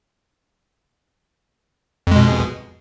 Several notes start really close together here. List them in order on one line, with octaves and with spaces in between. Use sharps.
F2 G#3 B2